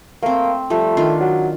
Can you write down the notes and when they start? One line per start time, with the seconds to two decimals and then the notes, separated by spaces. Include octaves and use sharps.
0.22 A3 A#3 C4
0.70 F3 G3 A3
0.97 D#3 D4 F4
1.20 F#3